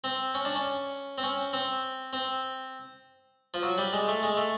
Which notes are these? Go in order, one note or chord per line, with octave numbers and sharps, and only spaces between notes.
C4
C#4
D4
C#4
C4
C#4
C4
C4
F3
F#3
G3
G#3
A3
G#3
A3